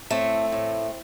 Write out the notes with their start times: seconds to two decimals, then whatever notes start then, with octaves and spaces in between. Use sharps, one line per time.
0.10 A2 A3 C4
0.52 A2